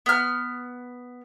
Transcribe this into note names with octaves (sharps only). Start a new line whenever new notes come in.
B3 F6